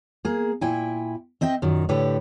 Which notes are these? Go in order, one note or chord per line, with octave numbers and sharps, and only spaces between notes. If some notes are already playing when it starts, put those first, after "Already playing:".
A#3 G#4
A#2 E4 G5 G#5
C4 D#5 E5 G5
F#2 A#2 D#3
A2 D3 G4 B4 C#5